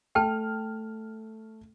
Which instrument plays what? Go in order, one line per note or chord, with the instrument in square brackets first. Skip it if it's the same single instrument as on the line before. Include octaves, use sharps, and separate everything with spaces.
[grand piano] A3 F6 [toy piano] G5 A5